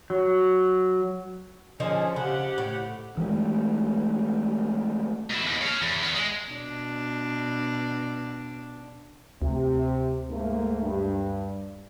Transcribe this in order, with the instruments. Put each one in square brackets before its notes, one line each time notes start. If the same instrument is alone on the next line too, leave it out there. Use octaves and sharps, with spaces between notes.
[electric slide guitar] F#3
[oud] D3 F3 D#4 [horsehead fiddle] C#4 G#4
[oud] C#3 [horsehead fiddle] G4 F#5
[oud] A2
[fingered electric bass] E3 G#3 A3
[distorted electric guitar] B2 E4
D#2
C#5 F5
E2
E2 B3
G#3
[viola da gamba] B2 D4
[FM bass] D2 [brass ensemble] C3
[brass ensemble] G#2 A3 A#3
G2